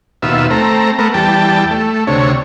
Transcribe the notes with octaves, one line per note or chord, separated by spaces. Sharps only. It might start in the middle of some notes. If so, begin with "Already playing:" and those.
D#2 B2 F4 E5
A3 C4 A#5
A3 B3 A#4
E2 G3 G5 A5
A3
D2 C3 C#5